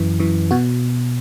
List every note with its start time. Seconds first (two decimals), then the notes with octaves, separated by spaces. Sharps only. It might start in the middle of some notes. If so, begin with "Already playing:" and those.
Already playing: F#2 E3
0.20 F#2 E3
0.51 B2 F#4